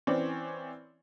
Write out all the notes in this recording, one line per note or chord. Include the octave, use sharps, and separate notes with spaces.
E3 C4 C#4 C#5 D5